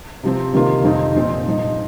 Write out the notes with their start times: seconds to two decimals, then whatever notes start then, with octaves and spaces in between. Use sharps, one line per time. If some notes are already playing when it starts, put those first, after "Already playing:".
0.23 C3 F3 C4
0.54 C3 D#3 A#3 F4
0.84 F2 C3 D#3 C4 D#4
1.15 A#2 F3 C4 D#4
1.46 G2 F3 D#4